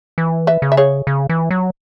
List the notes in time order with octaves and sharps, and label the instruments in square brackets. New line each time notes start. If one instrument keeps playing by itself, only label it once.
[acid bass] E3
[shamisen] B4 E5
[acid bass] C#3
[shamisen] E5
G#4 C#5
[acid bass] C#3
E3
F#3